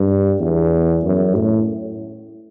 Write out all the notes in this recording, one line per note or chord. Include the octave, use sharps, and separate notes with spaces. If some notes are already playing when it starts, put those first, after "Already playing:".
Already playing: G2
E2
F#2
A2